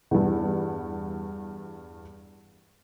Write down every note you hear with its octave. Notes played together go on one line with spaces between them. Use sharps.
E2 G2